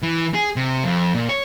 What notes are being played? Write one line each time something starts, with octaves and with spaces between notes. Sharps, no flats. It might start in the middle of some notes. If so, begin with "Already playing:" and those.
E3
G#4
C3
F2
A#2
C#5